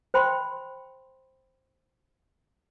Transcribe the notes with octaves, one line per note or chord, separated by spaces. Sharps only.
C5 G5 B5 C6